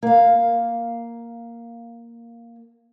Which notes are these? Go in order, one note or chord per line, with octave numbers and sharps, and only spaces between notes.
A#3 F5